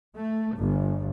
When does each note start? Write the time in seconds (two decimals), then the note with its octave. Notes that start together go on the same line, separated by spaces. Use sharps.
0.17 A3
0.57 G1